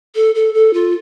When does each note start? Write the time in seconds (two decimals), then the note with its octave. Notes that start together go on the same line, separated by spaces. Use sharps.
0.15 A4
0.35 A4
0.54 A4
0.74 F4